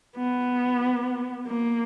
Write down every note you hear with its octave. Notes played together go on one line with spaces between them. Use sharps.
B3
A#3